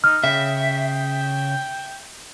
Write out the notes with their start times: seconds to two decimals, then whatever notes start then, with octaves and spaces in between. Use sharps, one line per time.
0.04 D#4 F6
0.24 C#3 E5 G5